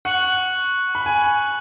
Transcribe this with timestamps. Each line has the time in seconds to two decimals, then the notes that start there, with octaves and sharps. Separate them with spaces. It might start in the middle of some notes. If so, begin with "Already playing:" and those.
0.05 F#5 C#6 F#6 C#7 F#7
0.95 B5
1.06 G#5